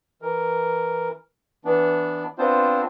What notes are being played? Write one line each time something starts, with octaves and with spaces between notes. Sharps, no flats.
E3 A#4
E3 B3 D4
B3 C4 D4 F4 C5